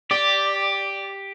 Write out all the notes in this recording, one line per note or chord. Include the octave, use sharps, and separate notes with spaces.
G4 D5